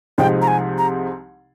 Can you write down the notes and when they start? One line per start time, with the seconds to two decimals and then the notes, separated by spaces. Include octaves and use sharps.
0.18 C2 C3 F3 G#3 D#4 G5
0.42 A#5
0.48 G#5
0.78 A#5